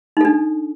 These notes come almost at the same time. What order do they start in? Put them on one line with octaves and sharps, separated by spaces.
D#4 A4 D4